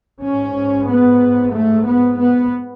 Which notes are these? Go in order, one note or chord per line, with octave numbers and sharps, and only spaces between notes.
G#2 C#4
B3
A3
B3
B3